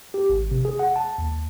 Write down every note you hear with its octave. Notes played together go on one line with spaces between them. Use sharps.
G4
G#1
C3
G#4
F#5
A5
D#2